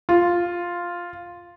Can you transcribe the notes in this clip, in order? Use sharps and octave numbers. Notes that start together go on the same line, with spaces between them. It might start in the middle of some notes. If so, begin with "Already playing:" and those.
F4